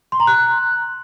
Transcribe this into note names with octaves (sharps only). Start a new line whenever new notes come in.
C6
A#5
F#6